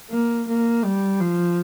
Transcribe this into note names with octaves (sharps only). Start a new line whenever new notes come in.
A#3
A#3
G3
F3